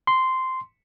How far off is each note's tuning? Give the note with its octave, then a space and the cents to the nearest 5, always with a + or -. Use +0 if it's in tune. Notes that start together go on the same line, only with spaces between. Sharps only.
C6 -10